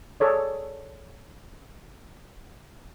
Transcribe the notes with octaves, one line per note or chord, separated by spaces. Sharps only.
G#4 A4 C#5 D5